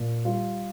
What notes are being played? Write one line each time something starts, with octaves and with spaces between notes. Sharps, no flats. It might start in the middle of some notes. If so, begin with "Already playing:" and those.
Already playing: A#2
G3 F4